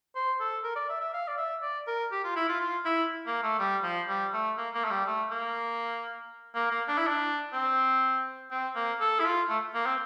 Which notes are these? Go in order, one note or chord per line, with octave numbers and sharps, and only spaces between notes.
C5
A4
A#4
D5
E5
E5
F5
D5
E5
D5
A#4
G4
F4
E4
F4
F4
E4
A#3
A3
G3
F3
G3
A3
A#3
A#3
A3
G3
A3
A#3
A#3
A#3
D4
E4
D4
C4
C4
A#3
A4
E4
F4
A3
A#3
C4